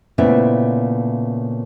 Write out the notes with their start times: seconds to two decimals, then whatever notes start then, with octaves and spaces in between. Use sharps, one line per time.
0.18 A#2 C#3 A3 B3 C4 E4